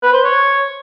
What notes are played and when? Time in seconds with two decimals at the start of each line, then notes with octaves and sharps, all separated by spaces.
0.02 B4
0.13 C5
0.24 C#5